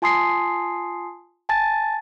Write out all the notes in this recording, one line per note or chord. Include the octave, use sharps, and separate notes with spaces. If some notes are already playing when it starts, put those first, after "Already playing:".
F4 G#5 A5 C6 D#6 C7
G#5 A5 A6